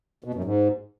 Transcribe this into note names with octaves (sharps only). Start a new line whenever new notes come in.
B2
F#2
G#2